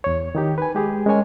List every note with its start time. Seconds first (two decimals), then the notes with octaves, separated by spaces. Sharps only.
0.04 E2 C#5
0.35 D#3 D#4 G4
0.58 B4 G#5
0.75 G#3 G4 G#4
1.06 G#3 C#4 A#4 C#5 G#5